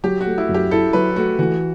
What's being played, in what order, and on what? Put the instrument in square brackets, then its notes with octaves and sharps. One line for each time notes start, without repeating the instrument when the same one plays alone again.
[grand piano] F#3 [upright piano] G4
[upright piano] F#4
[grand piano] A3
[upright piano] E4
[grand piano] F#2
[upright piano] G4
[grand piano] E4 [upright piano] A4
[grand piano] F#3 [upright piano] B4
[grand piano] A3 [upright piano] F#4
[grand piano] E3 [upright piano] F#4